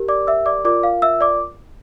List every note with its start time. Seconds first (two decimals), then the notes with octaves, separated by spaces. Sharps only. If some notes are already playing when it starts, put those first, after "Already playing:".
Already playing: G4 A#4
0.08 D5 D6
0.27 E5 E6
0.46 D5 D6
0.65 F4 A#4 D5 D6
0.83 F5
1.02 E5 E6
1.21 D5 D6